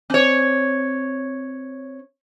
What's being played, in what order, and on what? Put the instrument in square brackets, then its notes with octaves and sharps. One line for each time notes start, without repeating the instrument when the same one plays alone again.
[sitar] C4 C#5